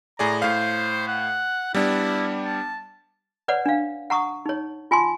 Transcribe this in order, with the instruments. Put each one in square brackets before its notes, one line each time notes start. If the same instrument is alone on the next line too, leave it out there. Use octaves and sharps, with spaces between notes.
[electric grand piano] A2 G#4 D5 [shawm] A#5
[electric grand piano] A2 F5 [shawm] C5
[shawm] F#5
[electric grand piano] G3 B3 D4 [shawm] E4
[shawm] A5
[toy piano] B4 C#5 D5 F#5
D4 F5
F#5 A#5 C#6 D#6
D#4 C#5
F4 G#5 A5 C6